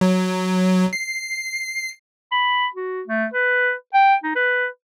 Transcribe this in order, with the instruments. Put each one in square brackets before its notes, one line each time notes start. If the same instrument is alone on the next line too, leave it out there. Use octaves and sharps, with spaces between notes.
[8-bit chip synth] F#3
C7
[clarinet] B5
F#4
A3
B4
G5
D#4
B4